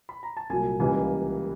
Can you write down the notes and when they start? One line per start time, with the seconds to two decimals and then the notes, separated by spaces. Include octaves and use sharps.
0.09 B5
0.23 A#5
0.37 A5
0.50 C2 A#2 F#3 G#5
0.80 C#2 C#3 E3 G3 A#3 G#5